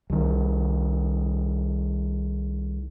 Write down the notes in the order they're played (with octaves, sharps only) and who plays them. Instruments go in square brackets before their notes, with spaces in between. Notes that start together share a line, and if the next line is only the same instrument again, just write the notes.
[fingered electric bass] C2 D#3